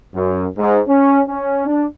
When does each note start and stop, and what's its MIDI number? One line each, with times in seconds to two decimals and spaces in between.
0.14 0.46 42
0.57 0.80 44
0.87 1.21 61
1.27 1.65 61
1.66 1.84 62